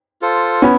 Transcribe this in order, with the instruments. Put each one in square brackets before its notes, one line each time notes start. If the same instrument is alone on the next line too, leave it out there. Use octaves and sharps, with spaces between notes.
[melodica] F4 A4 C5
[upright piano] B3 C#4 [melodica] E4